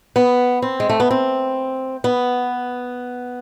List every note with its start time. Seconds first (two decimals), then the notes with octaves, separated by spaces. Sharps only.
0.16 B3
0.62 C4
0.80 G#3
0.89 A3
1.00 B3
1.11 C4
2.04 B3